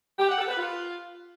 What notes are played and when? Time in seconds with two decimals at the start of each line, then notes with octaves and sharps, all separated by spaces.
0.19 G4
0.29 F#5
0.38 A4
0.48 B4
0.58 F4